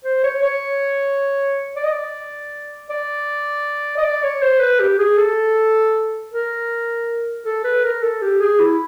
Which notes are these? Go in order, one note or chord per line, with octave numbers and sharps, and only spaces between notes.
C5
C#5
C#5
D5
D#5
D5
D5
D#5
D5
C#5
C5
B4
G4
G#4
A4
A#4
A4
B4
A#4
A4
G4
G#4
E4